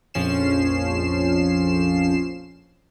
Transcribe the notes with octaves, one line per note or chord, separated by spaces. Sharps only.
A#1 F2 F3 C#4 C7 E7